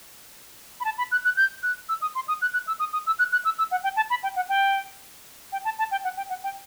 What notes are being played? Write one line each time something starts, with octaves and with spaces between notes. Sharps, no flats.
B5
A5
B5
F#6
F#6
G6
F#6
E6
D#6
C6
D#6
F#6
F#6
E6
D#6
D#6
E6
F#6
F#6
E6
E6
F#5
G5
A5
B5
G5
F#5
G5
G5
A5
A5
G5
F#5
G5
F#5
G5